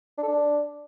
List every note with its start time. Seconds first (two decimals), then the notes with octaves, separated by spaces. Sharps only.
0.18 D4
0.23 A4
0.28 D4